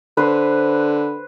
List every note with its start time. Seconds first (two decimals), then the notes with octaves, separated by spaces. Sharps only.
0.17 D3 B4 C5